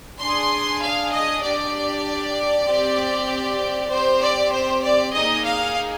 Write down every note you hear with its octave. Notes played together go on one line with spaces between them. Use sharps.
D4 G#4 C6
F5
D#5
D4 G4 D5
C4 G4
C4 G4 C5
D5
C5
D5
A#3 D#4 G#4 D#5
F5